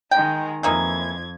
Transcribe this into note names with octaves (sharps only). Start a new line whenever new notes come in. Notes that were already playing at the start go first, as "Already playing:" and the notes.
D#3 G#3 G5 A#5
F2 E3 A#3 D#4 G#6